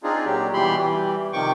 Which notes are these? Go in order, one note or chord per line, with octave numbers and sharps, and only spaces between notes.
C4 D4 D#4 F4 G#4
A#2 F#3 G4
B2 E3 G3 G4 B5 C6
E3 G3
C3 D#3 F3 G5 C#6 D6